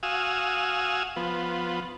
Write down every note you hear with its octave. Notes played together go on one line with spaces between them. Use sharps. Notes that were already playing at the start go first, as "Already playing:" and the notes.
F#4 F5 G#5 D#6 E6
F3 B3